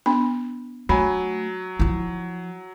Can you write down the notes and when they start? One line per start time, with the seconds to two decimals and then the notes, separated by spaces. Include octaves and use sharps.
0.06 B3 D4 B5
0.89 F#3 A3 D4 G#5 B5
1.79 F3 E4